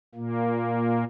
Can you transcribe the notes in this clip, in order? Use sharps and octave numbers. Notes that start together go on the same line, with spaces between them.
A#2 A#3